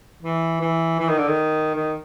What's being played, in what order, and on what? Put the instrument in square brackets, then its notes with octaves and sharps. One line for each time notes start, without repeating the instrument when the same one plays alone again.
[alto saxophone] E3
E3
E3
D#3
D3
D#3
D#3